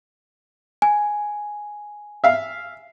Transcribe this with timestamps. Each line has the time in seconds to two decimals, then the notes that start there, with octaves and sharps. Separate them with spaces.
0.82 G#5
2.24 E5 F5